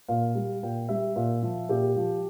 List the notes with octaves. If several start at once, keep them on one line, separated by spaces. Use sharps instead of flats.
A#2 F5
G3
A#2 G5
G3 E5
A#2
F3
A#2 G4
F3